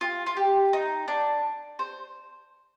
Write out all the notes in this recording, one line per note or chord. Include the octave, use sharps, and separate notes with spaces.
F4
F4
G4
D#4
D4
C5